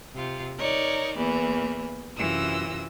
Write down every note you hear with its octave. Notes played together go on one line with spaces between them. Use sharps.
C3 F4
D#4 A#4 C#5 D5
E2 E3 A#3
F#2 C3 E3 F4 E6 A#6